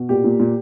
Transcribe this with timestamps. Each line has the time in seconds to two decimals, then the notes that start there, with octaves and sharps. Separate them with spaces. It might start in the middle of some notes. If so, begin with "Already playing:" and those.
Already playing: B2
0.09 A#2 G4
0.24 A#2
0.40 A#2